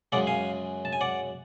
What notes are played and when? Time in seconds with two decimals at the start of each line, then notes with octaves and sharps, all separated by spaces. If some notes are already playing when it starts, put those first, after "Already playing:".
0.12 F#2 C#3 G#3 D5 F#5
0.27 F5 G#5
0.85 A5
0.93 G#5
1.01 D5 F#5